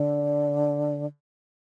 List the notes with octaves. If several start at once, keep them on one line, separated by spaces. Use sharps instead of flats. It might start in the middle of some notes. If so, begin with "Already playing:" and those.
Already playing: D3